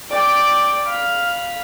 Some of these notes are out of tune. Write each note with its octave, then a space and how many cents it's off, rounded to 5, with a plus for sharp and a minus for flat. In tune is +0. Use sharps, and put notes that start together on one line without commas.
D5 +0 G5 +5
F5 +0 B5 -10